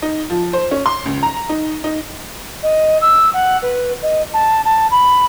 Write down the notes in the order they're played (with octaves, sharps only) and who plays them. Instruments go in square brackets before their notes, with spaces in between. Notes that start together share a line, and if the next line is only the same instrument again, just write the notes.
[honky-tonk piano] D#4
F3
C5
C#4
C6
C#2
A#5
D#4
D#4
[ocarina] D#5
E6
F#5
B4
D#5
A5
A5
B5